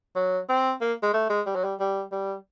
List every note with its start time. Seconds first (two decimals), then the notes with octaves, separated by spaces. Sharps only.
0.16 F#3
0.49 C4
0.81 A#3
1.03 G#3
1.13 A3
1.30 G#3
1.46 G3
1.55 F#3
1.64 G3
1.80 G3
2.11 G3